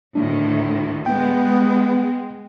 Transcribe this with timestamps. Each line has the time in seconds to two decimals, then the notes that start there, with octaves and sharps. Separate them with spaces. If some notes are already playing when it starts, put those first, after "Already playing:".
0.15 D2 A2 D#3 D4
1.06 G#3 B3 G5